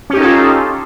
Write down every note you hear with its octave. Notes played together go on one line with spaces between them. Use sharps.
C#4 D#4 F4 G4 A4